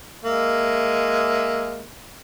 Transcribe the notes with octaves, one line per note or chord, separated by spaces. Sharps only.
G#3 A#3 E5